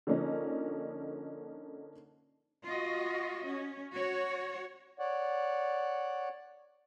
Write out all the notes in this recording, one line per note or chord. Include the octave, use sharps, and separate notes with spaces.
D3 F3 A#3 C#4 D#4
F4 F#4 D#5
C#4
F#4 C#5
C#5 D5 F#5